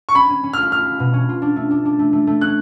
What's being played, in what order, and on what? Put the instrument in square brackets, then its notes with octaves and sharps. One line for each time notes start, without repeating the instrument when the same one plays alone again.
[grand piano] C#6
[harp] C#4 [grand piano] B5
[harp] C#4
C#4
[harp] F4 [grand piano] F6
[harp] F4 [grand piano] F6
[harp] F4
B2
C#4
F4
D4
A3
D4
D4
A3
A3
A3
[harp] C#4 [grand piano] F#6